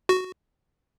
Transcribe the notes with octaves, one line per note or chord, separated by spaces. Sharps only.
F#4